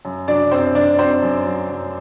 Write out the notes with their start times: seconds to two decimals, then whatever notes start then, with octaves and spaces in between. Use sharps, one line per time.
0.05 F#2
0.28 F#3 D4 D5
0.51 F#2 C4 C5
0.75 F#2 D4 D5
0.98 F#3 C4 C5
1.22 F#2
1.46 F#3
1.70 F#2